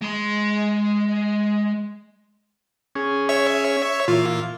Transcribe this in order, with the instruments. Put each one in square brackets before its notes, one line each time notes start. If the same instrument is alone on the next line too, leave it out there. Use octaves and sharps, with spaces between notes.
[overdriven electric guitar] G#3 C6
[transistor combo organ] C#4 G#4
[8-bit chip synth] C#5 E5 C#6
[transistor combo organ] A#2 E3 [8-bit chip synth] F4